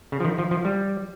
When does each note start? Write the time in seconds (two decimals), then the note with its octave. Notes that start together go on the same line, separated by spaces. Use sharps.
0.12 C#3
0.20 F3
0.25 D#3
0.38 F3
0.51 F3
0.65 G3